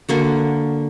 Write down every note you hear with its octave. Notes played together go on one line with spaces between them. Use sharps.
D3 A#3 F#4